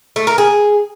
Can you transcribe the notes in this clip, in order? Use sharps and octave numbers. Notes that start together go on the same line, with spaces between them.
A3
A#4
G#4